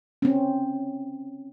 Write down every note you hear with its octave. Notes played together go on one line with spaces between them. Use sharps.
C4 C#4